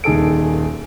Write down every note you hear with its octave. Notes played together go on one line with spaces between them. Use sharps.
D#1 D#3 G#4 A4 D7